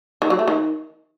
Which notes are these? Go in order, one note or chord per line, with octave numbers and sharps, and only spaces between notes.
D#3
F#3
A3
D#3